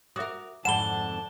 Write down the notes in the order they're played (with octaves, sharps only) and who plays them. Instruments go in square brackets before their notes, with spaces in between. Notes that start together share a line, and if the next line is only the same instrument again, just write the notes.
[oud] F#4 A#4 [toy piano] E5 D6 D#6
[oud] F2 G#2 D3 [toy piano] F#5 B5 [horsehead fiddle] A5 [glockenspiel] E7 G7